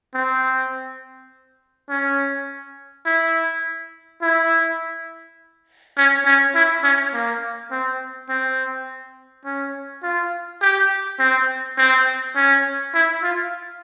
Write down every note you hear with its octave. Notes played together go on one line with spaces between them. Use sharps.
C4
C#4
E4
E4
C#4
C#4
E4
C#4
A#3
C4
C4
C#4
F4
G4
C4
C4
C#4
E4
F4